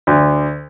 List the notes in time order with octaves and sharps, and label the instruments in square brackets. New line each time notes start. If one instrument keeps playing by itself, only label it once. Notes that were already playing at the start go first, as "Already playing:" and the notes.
[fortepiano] D2